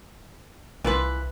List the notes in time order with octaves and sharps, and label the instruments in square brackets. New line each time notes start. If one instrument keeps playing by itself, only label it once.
[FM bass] C2 [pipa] E3 F4 B4